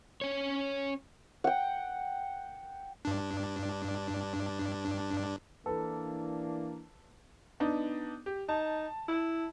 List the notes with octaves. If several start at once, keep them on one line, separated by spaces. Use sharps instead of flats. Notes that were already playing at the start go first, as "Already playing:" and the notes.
C#4 C#5
F#5 G5
G2 D4
E3 A#3 D4 A4 B4
B3 D4 D#4
G4
D#4 A5
E4